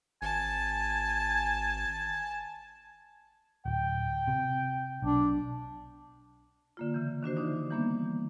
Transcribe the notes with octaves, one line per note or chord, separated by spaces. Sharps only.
G#1 G#5 A5
D1 G5
C3
B1 D4
D3 A#3 F4
C#3 E3
D#3 D4 F#4 C5
D3 E3 D4 D#4
E3 G3 A#3 B3 D4